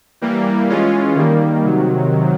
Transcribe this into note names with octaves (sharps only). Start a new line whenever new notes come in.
E3 G3 A#3
E3 G#3 C#4 F4
D#3 G3 A#3
C3 D#3 F#3